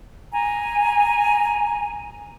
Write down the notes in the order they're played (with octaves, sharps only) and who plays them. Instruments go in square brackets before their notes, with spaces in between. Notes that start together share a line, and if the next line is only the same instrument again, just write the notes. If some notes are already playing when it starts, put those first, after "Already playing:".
[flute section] G#5 A#5